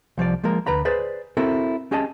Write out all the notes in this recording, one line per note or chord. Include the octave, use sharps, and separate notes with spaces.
C2 F3 C#5 D5
F3 G#3 A#3 A#4
D2 B4 A#5 B5
G#4 B4 C5 D5
C4 E4 F#4 A4 A#4
C#4 G4 G#4 D#5 G#5 A5